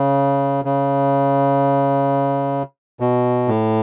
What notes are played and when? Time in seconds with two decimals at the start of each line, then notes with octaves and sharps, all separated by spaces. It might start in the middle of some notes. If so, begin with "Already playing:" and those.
Already playing: C#3
0.65 C#3
3.00 B2
3.48 A2